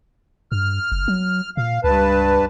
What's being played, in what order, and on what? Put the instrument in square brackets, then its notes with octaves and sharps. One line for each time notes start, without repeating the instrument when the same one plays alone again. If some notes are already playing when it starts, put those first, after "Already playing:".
[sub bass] G2 [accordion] F6
[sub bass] F#1
F#3
[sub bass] A#2 [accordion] F5
[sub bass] C#2 [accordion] G2 B4 A5